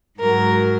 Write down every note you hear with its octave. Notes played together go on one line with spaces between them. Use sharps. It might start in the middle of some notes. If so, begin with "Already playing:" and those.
G#2 F#3 A#4